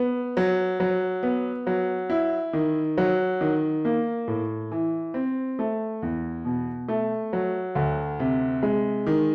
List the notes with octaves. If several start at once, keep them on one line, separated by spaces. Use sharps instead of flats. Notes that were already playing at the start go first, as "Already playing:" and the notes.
Already playing: B3
F#3
F#3
B3
F#3
E4
D#3
F#3
D#3
A#3
A2
E3
C4
A3
E2
B2
A3
F#3
D2
C3
G#3
D#3